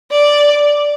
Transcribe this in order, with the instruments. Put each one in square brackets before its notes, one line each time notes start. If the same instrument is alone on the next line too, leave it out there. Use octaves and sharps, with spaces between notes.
[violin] D5